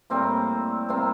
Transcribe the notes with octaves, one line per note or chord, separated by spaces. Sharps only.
A2 G3 A#3 C4
C3 G3 A#3 C4